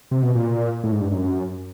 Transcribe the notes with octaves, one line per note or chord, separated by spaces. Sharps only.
C3
B2
A#2
A2
G#2
G2
F#2